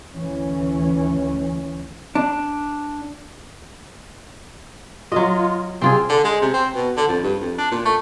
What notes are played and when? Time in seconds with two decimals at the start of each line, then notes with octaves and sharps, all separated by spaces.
0.14 D2 E3 C#4
2.15 D4
5.12 F#3 F4 D#5
5.81 C3 C4 F4 G#4
6.10 D3
6.24 G#3
6.41 C3
6.54 C4
6.75 B2
6.97 D3
7.08 F2
7.23 G2
7.41 F2
7.59 D4
7.71 A#2
7.85 A3